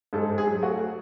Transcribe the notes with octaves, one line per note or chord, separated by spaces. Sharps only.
G#2 A4
G#2
G#4
F#3
A3 F#4